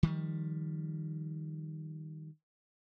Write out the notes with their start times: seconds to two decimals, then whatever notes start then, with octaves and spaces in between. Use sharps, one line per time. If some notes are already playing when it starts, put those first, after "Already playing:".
0.03 D#3 F3 G3